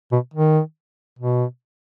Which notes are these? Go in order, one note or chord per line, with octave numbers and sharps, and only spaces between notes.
B2
D#3
B2